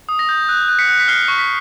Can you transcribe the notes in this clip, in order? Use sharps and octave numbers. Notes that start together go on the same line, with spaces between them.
D#6
A#6
G6
F#6
F#6
B6 C#7
F#6
B6
F6 C7
C#6
B6